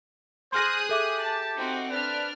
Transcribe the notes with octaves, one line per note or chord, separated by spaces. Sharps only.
G#4 C5 C6 D#6 F6 F#6 A#6
G4 A4 E5 D6
A5
C4 D#4 F#4
D4 B4 F6